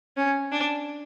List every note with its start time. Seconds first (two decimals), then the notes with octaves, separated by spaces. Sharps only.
0.17 C#4
0.52 D4